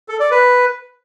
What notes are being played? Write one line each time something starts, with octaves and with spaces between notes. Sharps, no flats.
A4
D5
B4